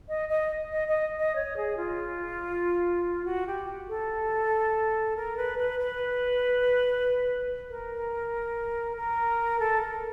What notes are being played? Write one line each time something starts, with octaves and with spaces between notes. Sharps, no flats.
D#5
D#5
D#5
D#5
D#5
C#5
G#4
F4
F#4
G4
A4
A#4
B4
B4
B4
A#4
A#4
A4
A#4